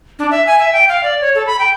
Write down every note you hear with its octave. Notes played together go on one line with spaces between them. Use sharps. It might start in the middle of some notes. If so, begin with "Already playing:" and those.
D4
E5
G#5
E5
G5
F5
D5
C#5
A4
B5
G5